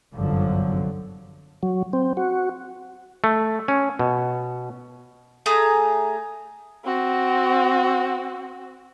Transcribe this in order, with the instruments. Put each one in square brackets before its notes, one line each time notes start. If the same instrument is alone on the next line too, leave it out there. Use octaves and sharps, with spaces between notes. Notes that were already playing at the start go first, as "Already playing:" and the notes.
[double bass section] G1 C2 F#2 D3 F3 F#3
[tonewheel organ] F#3
C4
F#4
[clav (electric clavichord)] A3
C#4
B2
[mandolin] A3 G#4 A#5 D#6
[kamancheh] C4 F#4